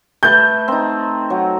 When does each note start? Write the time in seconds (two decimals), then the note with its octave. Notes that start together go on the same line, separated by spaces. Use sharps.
0.23 A3 B4 A5 G6
0.68 C4 D#4
1.30 F#3